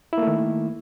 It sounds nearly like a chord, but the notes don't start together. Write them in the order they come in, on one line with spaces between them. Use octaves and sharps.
E4 A#3 A3 D#3